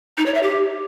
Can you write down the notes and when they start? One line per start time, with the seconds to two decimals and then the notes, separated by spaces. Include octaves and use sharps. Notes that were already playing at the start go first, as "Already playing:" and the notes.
0.17 D#4
0.26 C#5
0.34 E5
0.43 G4